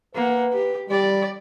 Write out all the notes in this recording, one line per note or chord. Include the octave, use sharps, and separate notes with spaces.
A#3 B4 F#5
G4
G3 G4 D5